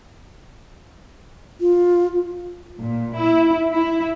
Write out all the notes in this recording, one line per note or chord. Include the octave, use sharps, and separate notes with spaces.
F4
A#2
E4
E4